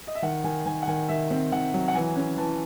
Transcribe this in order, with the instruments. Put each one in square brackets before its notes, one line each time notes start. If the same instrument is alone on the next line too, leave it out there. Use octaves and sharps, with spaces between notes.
[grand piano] D#5
E5
D#3 F#5
D#3 G#5
D#3 G#5
F#5
D#3 G#5
D#3 E5
C4
D#3 F#5
F#3
F#5
E3 G#5
C#4
E3 A5